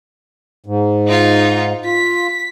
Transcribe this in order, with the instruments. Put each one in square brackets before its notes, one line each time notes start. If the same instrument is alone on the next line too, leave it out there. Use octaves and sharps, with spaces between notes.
[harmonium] G#2
[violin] D#4 F4
[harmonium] F4 [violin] B6